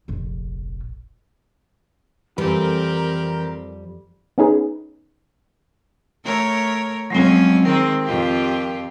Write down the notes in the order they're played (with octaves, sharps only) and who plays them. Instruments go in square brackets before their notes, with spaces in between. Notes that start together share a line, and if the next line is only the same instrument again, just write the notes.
[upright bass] F1 A#1
[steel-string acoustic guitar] F2 G3 [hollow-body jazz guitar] E3 B4 [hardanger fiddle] C4 G4 [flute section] A#4
[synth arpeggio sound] B3 C#4 D#4 G#4 B4
[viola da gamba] A3 A#4 C#5
[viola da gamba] F2 C#4 [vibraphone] F#3 G#3 C4
[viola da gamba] D#3 G#3 C4 [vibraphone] A#4
[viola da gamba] F2 F4 G4